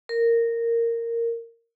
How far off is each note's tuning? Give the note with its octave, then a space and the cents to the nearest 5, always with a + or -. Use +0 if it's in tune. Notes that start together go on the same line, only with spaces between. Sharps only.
A#4 -10